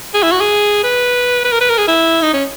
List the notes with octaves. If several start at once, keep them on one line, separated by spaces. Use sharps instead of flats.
G#4
E4
F#4
G#4
B4
B4
A#4
B4
A#4
G#4
E4
D#4
C#4